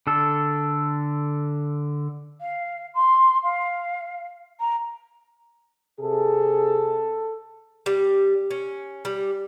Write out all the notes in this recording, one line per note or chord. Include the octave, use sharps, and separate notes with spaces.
D3 A4
F5
C6
F5
A#5
C3 G#4 A4
G3
C#4
G3